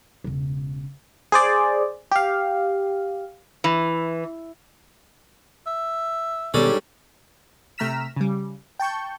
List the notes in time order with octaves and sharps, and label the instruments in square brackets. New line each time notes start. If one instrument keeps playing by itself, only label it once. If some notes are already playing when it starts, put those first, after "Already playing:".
[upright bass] E1 C#3
[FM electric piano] G#4 C5 D5
G4 F5
[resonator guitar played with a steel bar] E3
[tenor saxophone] E5
[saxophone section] G#2 G3 [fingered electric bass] B2 D#3 B3 [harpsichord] C#4 D4 A4
[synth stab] C3 A3 A#5 F6 B6 E7
C#3 G3
G5 A5 C#6 G6